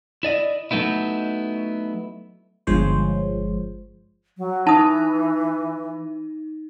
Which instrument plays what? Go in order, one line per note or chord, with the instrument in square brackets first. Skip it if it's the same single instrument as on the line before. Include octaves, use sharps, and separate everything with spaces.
[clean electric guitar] E4 D5 D#5
F#3 A3 B3 D#4 E4
[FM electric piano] G1 F3 G#3 C5 C#5
[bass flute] F#3
[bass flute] E3 [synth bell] D#4 [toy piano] A5 D#6